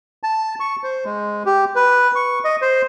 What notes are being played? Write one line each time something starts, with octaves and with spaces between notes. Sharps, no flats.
A5
C#6
C5
G#3
G4
B4
C#6
D#5
C5